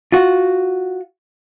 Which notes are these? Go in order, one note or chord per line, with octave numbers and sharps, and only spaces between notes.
F4 F#4